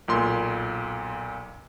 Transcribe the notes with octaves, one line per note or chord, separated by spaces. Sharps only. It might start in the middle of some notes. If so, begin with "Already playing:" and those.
B1 A#2 C6